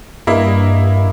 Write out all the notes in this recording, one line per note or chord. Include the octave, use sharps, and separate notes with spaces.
G2 A#3 E4 D#5